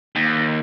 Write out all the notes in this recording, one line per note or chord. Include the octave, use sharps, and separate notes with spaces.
D#2